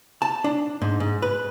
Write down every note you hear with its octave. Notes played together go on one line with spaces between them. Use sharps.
A5
D4
G#2
G#2
B4